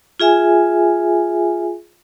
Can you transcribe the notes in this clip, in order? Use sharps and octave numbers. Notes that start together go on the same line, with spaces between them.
F4 G#4 E5 G#5